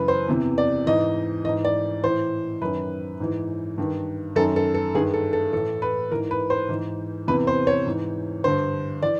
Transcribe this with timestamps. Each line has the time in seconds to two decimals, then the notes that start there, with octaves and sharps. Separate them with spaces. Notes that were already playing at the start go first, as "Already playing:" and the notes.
Already playing: F#2 C#3 E3 B4
0.08 C5
0.28 E2 C3 E3
0.58 D5
0.86 G#2 E3 D#5
1.44 E3 D#5
1.49 G#2
1.65 D5
2.04 A2 E3 C5
2.61 F#2 D#3 B4
3.20 G#2 E3
3.78 G2 D#3
4.36 F#2 D#3 A4
4.56 A4
4.74 A4
4.95 G2 D#3 G#4
5.14 A4
5.33 A4
5.53 A2 E3 A4
5.82 B4
6.11 E3 A#4
6.15 G#2
6.31 B4
6.50 C5
6.69 G#2 E3
7.27 E2 C3 E3 B4
7.47 C5
7.67 C#5
7.86 G#2 E3
8.44 G2 D3 C5
9.02 E3 D5